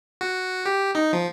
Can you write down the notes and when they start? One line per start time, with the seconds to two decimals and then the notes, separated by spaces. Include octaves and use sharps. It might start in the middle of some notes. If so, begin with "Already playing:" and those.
0.21 F#4
0.66 G4
0.95 D#4
1.13 F3